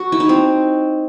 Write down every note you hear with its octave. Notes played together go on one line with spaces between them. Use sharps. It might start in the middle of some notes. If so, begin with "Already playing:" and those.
Already playing: F#4
E4
D#4
C4